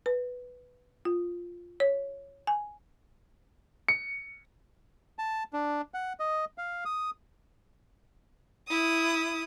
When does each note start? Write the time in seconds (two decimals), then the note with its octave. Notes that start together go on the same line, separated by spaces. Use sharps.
0.06 B4
1.05 F4
1.80 C#5
2.47 G#5
3.89 C#7
5.19 A5
5.53 D4
5.94 F#5
6.20 D#5
6.58 F5
6.85 D#6
8.69 E4 D#6